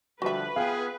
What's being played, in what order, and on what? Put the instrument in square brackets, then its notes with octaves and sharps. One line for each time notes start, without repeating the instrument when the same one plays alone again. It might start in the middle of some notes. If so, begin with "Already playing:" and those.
[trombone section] D3 F3 G3 [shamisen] F#4 E5 [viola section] B4
[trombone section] B3 F4 G#4 [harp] F5 G5